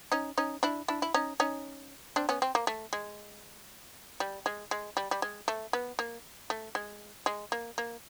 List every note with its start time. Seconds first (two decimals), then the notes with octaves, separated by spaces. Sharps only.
0.12 C#4 D#4
0.38 C#4 D#4
0.63 D4 E4
0.88 D4 E4
1.02 E4
1.14 C#4 D#4
1.40 C#4 D#4
2.16 C4 D4
2.29 B3 C#4
2.42 C4
2.55 A#3
2.67 A3
2.93 G#3
4.20 G3
4.46 G#3
4.71 G#3
4.97 G3
5.11 G3
5.22 G#3
5.48 A3
5.73 B3
5.99 A#3
6.50 A3
6.75 G#3
7.26 G#3
7.52 A#3
7.78 A#3